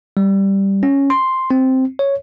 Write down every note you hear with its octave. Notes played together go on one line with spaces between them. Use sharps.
G3
C#4
C6
C4
C#5